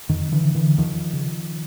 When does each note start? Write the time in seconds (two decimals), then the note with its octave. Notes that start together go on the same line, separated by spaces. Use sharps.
0.09 F2 D#3
0.32 D3 E3
0.44 D3
0.55 D3 E3
0.78 E2 D#3 F3
1.13 C#3